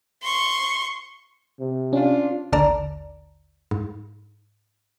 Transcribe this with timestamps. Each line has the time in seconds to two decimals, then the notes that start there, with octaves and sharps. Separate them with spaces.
0.23 C6 C#6
1.60 C3
1.93 C#4 D4 F4
2.52 A1 D#2 D3 D5 A5 A#5
3.71 G#2